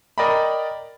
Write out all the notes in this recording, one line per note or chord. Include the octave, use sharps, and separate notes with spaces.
A#4 D5 D#5 G5 A#5 B5